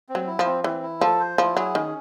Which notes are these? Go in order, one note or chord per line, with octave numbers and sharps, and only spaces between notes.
C4
F#3
E4
F3
C4
E3 C4
E4
F3 A4
C5
F3 E4
F#3 G#4
D#3 C#4